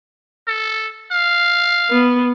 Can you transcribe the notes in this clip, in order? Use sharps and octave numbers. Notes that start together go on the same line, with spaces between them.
A4
F5
B3